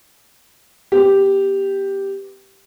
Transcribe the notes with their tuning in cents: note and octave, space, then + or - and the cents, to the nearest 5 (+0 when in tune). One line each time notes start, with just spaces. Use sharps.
B3 +0 G4 +0